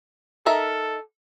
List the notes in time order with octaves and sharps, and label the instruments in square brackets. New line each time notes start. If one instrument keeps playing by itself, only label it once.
[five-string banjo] D#4 A#4 E5 [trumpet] A4